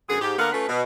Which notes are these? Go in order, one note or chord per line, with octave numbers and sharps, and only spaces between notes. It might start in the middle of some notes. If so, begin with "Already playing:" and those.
F#2 D3 B3 G#4
G#2 G4
D3 A#3 B3 A#4 F5 F#5
A3 C#4 F4 A4 B4
B2